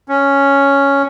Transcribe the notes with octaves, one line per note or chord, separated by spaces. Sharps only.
C#4